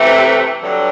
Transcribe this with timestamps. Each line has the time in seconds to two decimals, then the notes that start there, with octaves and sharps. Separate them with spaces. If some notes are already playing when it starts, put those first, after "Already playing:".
Already playing: C3 E3 A3
0.62 G2 D3 F#3